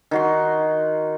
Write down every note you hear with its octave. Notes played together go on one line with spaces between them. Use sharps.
D#3 F#4 C6